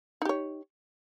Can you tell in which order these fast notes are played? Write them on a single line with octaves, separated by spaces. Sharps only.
D#4 G4 C#5